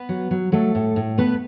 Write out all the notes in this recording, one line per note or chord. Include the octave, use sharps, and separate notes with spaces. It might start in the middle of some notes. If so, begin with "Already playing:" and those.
Already playing: B3 B4
F#3
F#3
F#3 A3 A4
A2
A2
A3 B3 B4